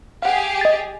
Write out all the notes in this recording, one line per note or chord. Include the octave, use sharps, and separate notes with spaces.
G4 G#4 F5 F#5
D#5 A6